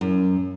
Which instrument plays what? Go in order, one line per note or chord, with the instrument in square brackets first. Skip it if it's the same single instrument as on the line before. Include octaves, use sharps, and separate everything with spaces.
[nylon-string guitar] F#2